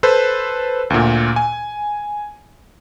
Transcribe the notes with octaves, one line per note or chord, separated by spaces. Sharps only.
A4 B4 C5
D2 A#2
G#5